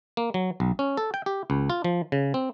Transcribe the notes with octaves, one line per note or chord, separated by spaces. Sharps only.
A#3
F#3
B1
C#4
A4
G5
G4
C#2
F4
F3
C#3
C4